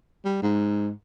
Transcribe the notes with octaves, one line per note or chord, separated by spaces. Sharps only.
G3
G#2